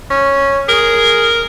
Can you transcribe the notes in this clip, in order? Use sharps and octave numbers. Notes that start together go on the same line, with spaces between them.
C#4
G#4 A#4